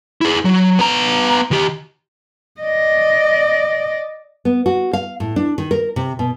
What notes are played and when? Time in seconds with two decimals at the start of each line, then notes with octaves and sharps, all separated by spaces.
0.21 E4 G#4
0.45 F#3
0.79 B3 A#5
1.51 D#3 G4
2.61 D5 D#5
4.45 B3
4.66 F#4
4.93 F5
5.20 A2
5.36 D4
5.58 D#3
5.71 A#4
5.96 C3
6.19 B2